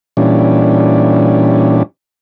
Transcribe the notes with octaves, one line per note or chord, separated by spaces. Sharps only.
A#2 E3 G3 C#4 D4